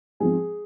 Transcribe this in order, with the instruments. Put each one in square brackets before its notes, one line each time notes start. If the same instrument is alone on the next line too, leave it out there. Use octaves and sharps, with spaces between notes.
[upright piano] G#2 F3 C4 G#4